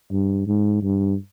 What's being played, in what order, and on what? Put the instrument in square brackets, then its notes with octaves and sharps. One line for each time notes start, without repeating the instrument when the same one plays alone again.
[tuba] G2
G#2
G2